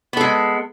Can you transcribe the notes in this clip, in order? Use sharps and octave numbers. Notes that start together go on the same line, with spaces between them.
G#3 B3 A4